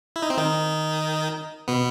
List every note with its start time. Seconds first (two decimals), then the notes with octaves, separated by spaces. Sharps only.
0.16 E4
0.23 D#4
0.30 C4
0.37 D#3 D#4
1.68 B2 B3